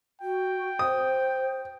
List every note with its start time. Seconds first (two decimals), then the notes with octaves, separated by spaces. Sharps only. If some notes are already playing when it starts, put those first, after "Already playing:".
0.22 F#4 G5
0.79 C5 D#6